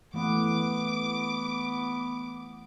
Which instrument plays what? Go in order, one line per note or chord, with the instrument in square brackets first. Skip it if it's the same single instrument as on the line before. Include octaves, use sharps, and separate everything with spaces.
[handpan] E3 A3 F#5 [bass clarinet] B3 [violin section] D6